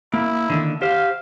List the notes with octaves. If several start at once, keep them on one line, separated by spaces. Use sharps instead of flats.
A#3 E4
D3 D#3 A#3
G4 C5 F5